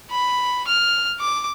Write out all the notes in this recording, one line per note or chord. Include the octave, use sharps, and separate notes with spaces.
B5
F6
D6